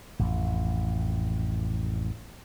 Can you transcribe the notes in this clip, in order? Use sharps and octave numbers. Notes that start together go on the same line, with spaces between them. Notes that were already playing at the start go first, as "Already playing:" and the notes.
A1 F2